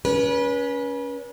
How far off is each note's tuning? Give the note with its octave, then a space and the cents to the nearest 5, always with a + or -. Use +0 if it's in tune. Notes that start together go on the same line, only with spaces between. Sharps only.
C#4 +20 B4 -35